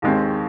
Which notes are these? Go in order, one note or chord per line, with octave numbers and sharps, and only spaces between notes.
D#2 D#3 G#3 C4